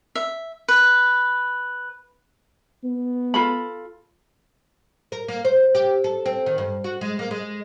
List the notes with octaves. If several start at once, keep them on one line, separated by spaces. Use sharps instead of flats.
E5
B4
B3
F4 A4 B5
A#4
A#3
C5
G4
A4
C4
D#3
G2
F#4
G#3
A#3
G#3